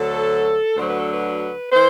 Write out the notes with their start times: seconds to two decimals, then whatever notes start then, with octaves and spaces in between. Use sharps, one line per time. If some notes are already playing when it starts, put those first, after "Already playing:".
Already playing: D2 D3 F#3 A4
0.76 D2 D3 F#3 C5
0.88 B4
1.00 A4
1.11 B4
1.71 E3 C5